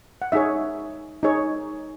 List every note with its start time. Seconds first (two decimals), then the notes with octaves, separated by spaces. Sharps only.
0.22 F#5
0.32 D#4 G#4 C#5 E5
1.23 D#4 G#4 C#5